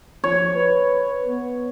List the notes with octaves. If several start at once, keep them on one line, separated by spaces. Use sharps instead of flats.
F3 C#5
B4
B3